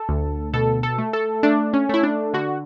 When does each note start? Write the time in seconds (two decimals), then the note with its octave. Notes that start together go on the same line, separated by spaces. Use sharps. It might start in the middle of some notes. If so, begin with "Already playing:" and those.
Already playing: A4
0.09 D2
0.53 B2 A4
0.83 A4
0.98 A3
1.13 A4
1.43 A3 D4
1.73 C#4
1.89 A3 E4
2.03 D4
2.33 D3 F#4